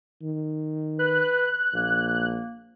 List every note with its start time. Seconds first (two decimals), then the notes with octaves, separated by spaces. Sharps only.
0.23 D#3
0.99 B4 F#6
1.74 A#1 A#3